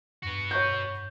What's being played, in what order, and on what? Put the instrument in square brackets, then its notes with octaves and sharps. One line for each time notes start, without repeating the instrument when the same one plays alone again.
[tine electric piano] E2 G2 [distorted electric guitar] F#4 B4
[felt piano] C#5 C#6 G6